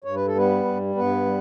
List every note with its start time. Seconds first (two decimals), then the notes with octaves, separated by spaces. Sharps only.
0.04 G2 C#5
0.15 B4
0.27 A4
0.35 G3 B3 B4
0.65 G2
0.95 G2 B3 B4
1.26 G3